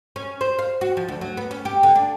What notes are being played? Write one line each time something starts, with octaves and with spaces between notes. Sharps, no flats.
C#4
C5
F5
F#4
F3
D2
F#3
B3
C#4
G4
D3
D4